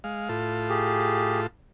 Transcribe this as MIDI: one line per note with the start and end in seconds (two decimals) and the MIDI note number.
0.04 0.29 56
0.04 0.29 77
0.29 1.47 45
0.29 1.47 65
0.29 1.47 69
0.69 1.40 67
0.69 1.40 68